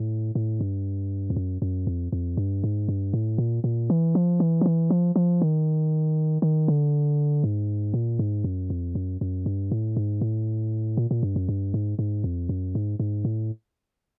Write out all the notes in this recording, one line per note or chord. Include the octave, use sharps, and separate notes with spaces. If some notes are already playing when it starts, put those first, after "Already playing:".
Already playing: A2
A2
G2
F2
F#2
F#2
F2
F2
G2
G#2
G2
A2
A#2
A#2
E3
F3
E3
F3
E3
F3
F3
D#3
D#3
D3
G#2
A#2
G#2
F#2
F2
F#2
F#2
G2
A2
G#2
A2
A#2
A#2
G2
F#2
G2
G#2
G#2
F2
F#2
G#2
G#2
A2